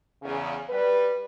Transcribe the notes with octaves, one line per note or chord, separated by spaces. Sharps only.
E2 C#3
G3 B4